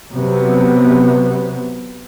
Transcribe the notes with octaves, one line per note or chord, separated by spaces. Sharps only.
C3 F#3 B3